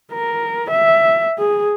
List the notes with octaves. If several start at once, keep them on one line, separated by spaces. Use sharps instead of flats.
A#4
E5
G#4